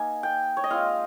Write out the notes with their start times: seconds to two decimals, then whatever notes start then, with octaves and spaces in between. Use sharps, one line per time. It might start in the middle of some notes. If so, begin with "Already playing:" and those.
Already playing: A#3 D#4 G#5
0.23 G5
0.57 C#5
0.64 D#5
0.71 G#3 C4 F4 F5